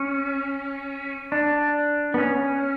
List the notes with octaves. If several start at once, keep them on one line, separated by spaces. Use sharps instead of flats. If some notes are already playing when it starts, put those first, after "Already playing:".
Already playing: C#4
D4
B3
C#4